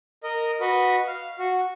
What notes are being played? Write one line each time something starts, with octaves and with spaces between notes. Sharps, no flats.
A#4 D#5
F#4 B4 D#5
F5
F#4